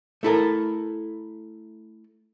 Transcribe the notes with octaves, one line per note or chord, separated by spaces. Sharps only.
A3 E4 A4 A#4